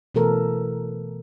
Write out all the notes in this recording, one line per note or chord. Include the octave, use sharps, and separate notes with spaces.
B2 E3 A3 A4 A#4